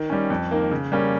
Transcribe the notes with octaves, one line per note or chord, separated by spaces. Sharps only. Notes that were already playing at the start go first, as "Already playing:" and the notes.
Already playing: D#3
G3 C#4
F2
D#3 A#3
C#3
G3 A#3 C#4